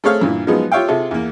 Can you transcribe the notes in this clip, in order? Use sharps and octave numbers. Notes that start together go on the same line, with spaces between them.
A3 C4 G#4 C#5 F5 F6
G2 A#2 E3
F3 F#3 G#3 B3 D#4 G#4
F4 G4 C#5 E5 F5 G5
C3 F4 G#4 A4
E2 A#3